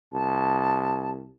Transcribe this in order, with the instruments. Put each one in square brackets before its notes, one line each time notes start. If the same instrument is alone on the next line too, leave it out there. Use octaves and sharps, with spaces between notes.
[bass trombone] C2 [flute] A5